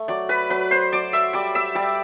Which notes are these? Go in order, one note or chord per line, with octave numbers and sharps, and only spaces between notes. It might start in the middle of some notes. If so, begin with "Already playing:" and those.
Already playing: A3
F#3 D5 D6
B4 B5
F#3 B4 B5
C5 C6
F#3 D5 D6
E5 E6
G3 D5 D6
E5 E6
G3 D5 D6